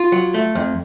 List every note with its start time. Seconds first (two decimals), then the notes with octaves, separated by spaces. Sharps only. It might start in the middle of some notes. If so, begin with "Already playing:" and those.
Already playing: F4
0.12 F#3
0.34 A3
0.55 F2